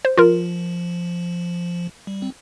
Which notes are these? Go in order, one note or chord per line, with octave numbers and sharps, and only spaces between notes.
C5
F3 F4 A#4
G3
C4